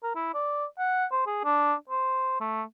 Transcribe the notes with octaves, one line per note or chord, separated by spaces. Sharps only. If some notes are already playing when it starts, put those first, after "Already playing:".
A#4
E4
D5
F#5
C5
G#4
D4
C5
A3